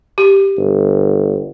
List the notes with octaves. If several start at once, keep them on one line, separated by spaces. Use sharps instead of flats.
G4
G1